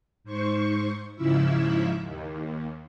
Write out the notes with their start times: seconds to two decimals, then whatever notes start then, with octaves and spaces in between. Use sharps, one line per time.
0.24 G#2 C5 C#6
1.16 G#2 C#3 F3 E4 E5
2.01 D#2